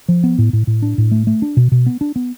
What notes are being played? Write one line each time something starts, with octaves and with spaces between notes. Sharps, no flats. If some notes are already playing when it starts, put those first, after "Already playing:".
F3
B3
A2
A2
A2
D4
A2
A3
A3
D4
B2
B2
B3
D4
B3